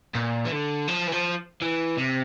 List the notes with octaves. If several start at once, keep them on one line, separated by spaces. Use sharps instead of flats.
A#2
E3
D3
F3
E3
F3
E3
C3